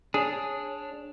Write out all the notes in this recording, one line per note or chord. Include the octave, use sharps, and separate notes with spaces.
D4 G#4 C#5